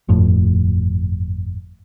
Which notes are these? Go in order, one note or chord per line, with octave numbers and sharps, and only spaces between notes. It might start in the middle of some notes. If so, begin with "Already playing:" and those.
G1 F2 A2